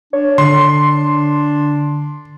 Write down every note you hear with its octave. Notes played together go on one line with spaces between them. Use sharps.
D4 C#5
D3 C6